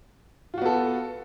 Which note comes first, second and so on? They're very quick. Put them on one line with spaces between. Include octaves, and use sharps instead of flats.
F4 F#4 B3 A4